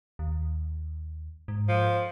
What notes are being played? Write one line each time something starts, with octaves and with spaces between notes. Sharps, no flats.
D#2
G#2
F3